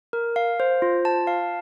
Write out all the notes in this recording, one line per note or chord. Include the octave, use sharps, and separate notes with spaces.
A#4
F5
C5
F4
A5
F5